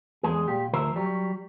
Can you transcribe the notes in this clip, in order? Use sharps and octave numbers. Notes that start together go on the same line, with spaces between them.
E2 G#3 G#4
A#2 G3 G4
D2 F3 A#4 C5 E5
F#3 G3